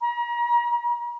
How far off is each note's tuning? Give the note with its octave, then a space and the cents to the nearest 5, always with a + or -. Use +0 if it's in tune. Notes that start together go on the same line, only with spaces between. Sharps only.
A#5 +40